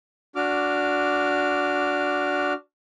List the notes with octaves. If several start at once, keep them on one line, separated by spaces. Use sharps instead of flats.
D4 F#4 D6 F6